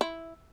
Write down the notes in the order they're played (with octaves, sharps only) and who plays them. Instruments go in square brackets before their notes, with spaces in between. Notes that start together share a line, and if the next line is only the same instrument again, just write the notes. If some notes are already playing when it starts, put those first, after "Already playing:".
[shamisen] E4